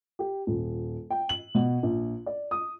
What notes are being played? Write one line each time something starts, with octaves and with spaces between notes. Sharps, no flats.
G4
D#1
G5
F#7
B2
A#1
D5
D#6